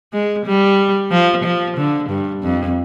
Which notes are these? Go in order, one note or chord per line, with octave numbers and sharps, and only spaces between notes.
G#3
G3
F3
F3
D3
G2
F2